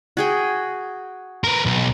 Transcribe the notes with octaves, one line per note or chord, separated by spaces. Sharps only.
F#4 G#4 G5
A#4 B4
B1